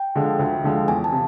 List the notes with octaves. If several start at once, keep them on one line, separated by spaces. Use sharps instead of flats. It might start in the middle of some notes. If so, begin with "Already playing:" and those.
Already playing: G5
D3 F3 G#3
D2
D3 F3 G#3
E2 G#5
A5
C3 F3